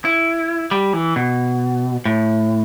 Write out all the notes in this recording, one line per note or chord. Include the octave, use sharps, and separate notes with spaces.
E4
G3
E3
B2
A2